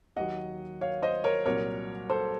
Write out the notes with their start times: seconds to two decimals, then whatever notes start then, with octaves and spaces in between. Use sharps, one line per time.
0.16 D#2 D#3 F#3 D#5 F#5
0.81 C#5 F5
1.02 C5 D#5
1.24 A#4 C#5
1.46 C2 A#2 F#3 A#4 C#5
2.10 A4 C5